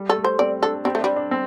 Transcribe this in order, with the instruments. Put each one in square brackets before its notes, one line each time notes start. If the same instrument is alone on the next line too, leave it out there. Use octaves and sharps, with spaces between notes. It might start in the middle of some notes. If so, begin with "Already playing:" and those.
Already playing: [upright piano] G3
[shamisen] A4
[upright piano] A3
[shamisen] C5
[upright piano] C4 [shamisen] D5
[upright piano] D4 [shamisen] A4
[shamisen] G3 [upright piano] C4
[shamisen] A3
[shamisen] G3 [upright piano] D4
[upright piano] D4
C4